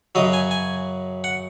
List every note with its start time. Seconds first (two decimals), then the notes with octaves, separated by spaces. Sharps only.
0.15 F#2 C#3 F#3 D#5
0.33 G#5
0.51 G#5
1.24 F#5